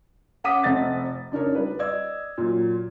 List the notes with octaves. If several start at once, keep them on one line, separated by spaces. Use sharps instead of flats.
C#4 F#5 D6 D#6 B6 D#7
F1 A3 C4 D#5 F#5 A6
C#3 D4 D#4 A#4 C#5
G3 B4
D5 D#5 E6 G#6
A#2 F#3